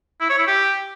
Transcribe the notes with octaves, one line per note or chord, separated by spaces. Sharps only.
E4
C#5
E4
G4